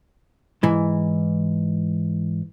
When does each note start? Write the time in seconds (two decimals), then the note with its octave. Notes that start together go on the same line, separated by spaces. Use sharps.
0.63 G#2 E3